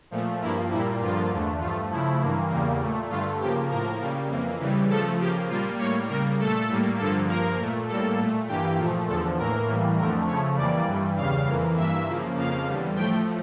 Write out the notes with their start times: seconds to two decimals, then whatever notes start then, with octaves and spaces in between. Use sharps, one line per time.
0.11 A#2 F3 A3
0.41 G2 F3 A#3 E4
0.71 A#2 G3 A#3 E4
1.00 G2 D3 F3 A#3 F4
1.31 E2 D3 A3
1.60 G2 F3 A3 F4
1.90 C#3 F3 A3 E4
2.20 G2 E3 A#3
2.50 E2 C#3 G3 A#3
2.80 A#2 A3
3.10 G2 D3 A3 F4
3.40 C#3 F3 A#3 G4
3.70 A2 F3 A#3 A#4
4.00 C#3 G3 A#3
4.29 F2 E3 A#3
4.59 C#3 E3 G3
4.90 C#3 F3 A3 A4
5.20 C#3 F3 A#3 G4
5.49 A#2 G3 A#3 F4
5.79 A2 G3 A#3 C#5
6.09 C#3 G3 A#3 A#4
6.39 A#2 A3 A4
6.69 A2 G3 A#3
6.99 G2 D3 F3 A#3 A4
7.28 G2 F3 A#3 A#4
7.59 A#2 A3
7.88 A2 G3 A#3 A4
8.18 A#2 A3
8.48 G2 E3 A#3 G4
8.78 A#2 F3 A3
9.08 E2 D3 F3 A4
9.38 A2 E3 A#3 A#4
9.68 A2 E3 G3 A#3
9.98 F2 D3 F3 A3 A#4
10.27 C#3 F3 A3 C#5
10.57 F2 E3 G3 A#3 D5
10.87 G2 E3 G3
11.17 E2 C#3 G3 F5
11.47 F2 E3 A#3
11.77 G2 E3 A#3 E5
12.07 C#3 F3 A#3
12.36 F2 C#3 F3 A#3 F5
12.66 E2 D3 G3
12.96 A2 F3 A3 G5